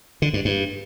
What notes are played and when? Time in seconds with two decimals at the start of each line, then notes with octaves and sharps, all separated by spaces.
0.22 D3
0.34 G2
0.45 G2